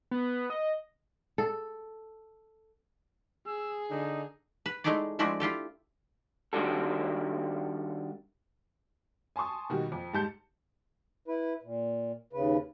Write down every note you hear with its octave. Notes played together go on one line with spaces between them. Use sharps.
B3
D#5
A4
G#4 E6
D3 D#4
B4
G#3 A3 D#4 E4 G#4 D5
F3 G#3 A3 D4 E4 F#4
E4 F4 G4 A4
D#3 G3 D4 F#4 A4
G#5 A5 C6 C#6 D#6
B2 D#3 G3 F#4
F2
G#2 G3 A5 G6 C#7
E4 B4
A#2
D#2 C#3 B4